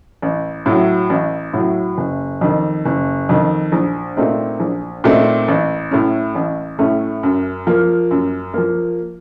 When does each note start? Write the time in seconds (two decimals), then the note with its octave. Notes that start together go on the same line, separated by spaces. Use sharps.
0.22 A1
0.66 A2 F#3
1.10 A1
1.54 A2 F#3
1.98 F#1
2.41 F2 D#3
2.85 F#1
3.29 F2 D#3
3.72 A#1
4.17 A#2 A3 C4 D#4
4.60 A#1
5.04 A#2 A3 C4 D#4
5.48 A1
5.91 A2 A3 C#4
6.35 A1
6.79 A2 A3 C#4
7.23 F#2
7.67 F3 A#3
8.11 F#2
8.54 F3 A#3